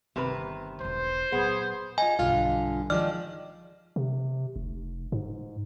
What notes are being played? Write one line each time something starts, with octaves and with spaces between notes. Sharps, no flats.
G1 C3 D#3 B4
E1 B1 C5
A#2 F#3 B3 G#4
F4 D#5 G#5
B1 G2 D3 F4 F5
D#3 F3 G#3 D5 F6
C3
F1
G#2